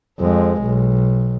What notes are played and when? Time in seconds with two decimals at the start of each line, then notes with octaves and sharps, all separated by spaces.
0.20 F2 G#3
0.63 B1